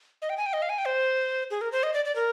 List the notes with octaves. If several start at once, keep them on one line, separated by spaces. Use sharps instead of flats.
D#5
G5
G#5
G5
D#5
F5
G#5
G5
C5
G#4
A#4
C5
D#5
D5
D5
A#4